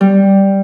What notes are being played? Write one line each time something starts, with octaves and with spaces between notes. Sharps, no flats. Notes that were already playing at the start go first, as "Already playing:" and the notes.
G3